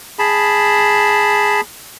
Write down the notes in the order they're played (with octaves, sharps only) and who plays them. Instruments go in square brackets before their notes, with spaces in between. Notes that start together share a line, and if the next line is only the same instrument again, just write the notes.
[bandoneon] G#4 A5 B5